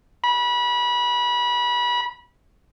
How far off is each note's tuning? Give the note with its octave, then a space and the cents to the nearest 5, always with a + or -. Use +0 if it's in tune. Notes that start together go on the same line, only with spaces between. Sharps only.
B5 -30